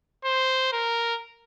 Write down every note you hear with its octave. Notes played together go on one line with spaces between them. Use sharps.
C5
A#4